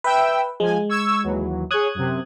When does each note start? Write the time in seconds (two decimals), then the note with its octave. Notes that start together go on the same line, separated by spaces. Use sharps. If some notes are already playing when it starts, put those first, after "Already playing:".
0.04 B4 E5 G5 E6
0.60 F3 G#3 G#5
0.89 C#6 E6 G#6
1.23 D#2 E3 F#3
1.71 G#4 C#5 D#6 F#6 G#6
1.95 F#2 C3